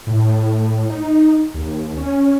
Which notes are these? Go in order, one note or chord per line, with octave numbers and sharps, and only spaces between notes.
A2
D#4
D#2
C#4